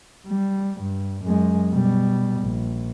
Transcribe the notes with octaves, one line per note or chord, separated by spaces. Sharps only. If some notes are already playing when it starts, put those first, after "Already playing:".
G3
G2
F#2 G#3
B2 G3
A#1